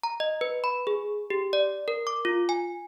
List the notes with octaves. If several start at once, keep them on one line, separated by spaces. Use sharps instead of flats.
A#5
D#5
B4
B5
G#4
G4
D5
A#4
D6
F4
G#5